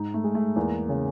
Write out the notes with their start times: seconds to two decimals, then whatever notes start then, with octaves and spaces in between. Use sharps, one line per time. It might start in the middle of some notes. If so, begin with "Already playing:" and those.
Already playing: G#2 D#4
0.14 A3
0.24 G#3
0.35 A3
0.56 E2 A#3
0.89 C#3